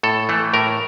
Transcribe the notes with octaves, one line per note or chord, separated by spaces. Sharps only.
A2 A4
E3 A3
A2 A#4